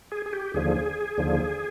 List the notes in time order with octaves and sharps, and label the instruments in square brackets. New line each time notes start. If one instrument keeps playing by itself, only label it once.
[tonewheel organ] G#4
G#4
G4
D#2 D3 F3 G#4
D#2 D3 F3